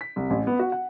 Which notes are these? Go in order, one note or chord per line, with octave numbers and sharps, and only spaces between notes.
B6
C2
A1
B3
F#4
F#5